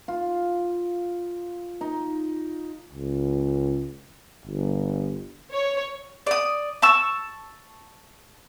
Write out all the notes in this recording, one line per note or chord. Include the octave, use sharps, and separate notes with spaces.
F4
D#4
C#2
G1
C#5
D5 D#6
A5 C#6 E6